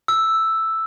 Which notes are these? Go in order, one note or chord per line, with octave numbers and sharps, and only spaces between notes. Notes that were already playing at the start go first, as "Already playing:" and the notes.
E6